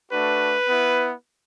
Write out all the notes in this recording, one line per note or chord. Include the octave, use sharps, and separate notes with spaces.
A3 D4 F#4 B4
B3 E4